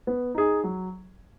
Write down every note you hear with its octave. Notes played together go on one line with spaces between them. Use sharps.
B3
D#4 G#4
F#3